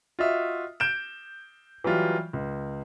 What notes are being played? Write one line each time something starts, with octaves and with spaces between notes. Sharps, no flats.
F4 F#4 D#5 E5
G6 D7 E7
E3 F#3 G3 F4
C#2